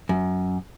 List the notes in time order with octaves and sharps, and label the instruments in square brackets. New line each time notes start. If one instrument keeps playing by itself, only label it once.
[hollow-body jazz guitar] F#2